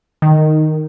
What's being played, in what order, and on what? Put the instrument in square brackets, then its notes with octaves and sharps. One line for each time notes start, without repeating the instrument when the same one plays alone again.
[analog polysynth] D#3